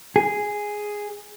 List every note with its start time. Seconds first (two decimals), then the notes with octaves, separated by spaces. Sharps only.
0.16 G#4